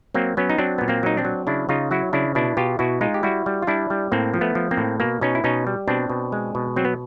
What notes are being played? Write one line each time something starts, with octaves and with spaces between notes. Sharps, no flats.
F#3 A#3 C4
F#3 B3 C#4
D#4
F#3 C4 D4
A#2 B3
A#3 C4
F#3 D#4
C4 D4
F#3
C#3 D4 E4
C#3 D#4 F4
F#3 E4 F#4
C#3 D4 E4
B2 D4 E4
B2 F4 G4
B2 E4 F#4
G#3 D#4 F4
G4
G3 E4 F#4
G3
F4
G3 D4 E4
G3
A2 A#3 C4
F3
A3 B3
F3
A#3 C4
A2
B2 A#3
B2 C#4 D#4
E4
B2 C#4 D#4
G3
B2 C4 D4
B2
G#3
B2
F#3 C4
B3